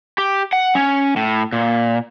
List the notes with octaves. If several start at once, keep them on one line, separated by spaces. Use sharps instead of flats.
G4
F#5
C#4
A2
A#2